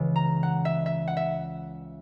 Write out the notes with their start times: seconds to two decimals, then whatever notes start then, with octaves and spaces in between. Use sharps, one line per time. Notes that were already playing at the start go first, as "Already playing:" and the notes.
Already playing: C#2 C#3 E3 G#3
0.16 A#5
0.43 F#5
0.65 E5
0.86 E5
1.07 F#5
1.17 E5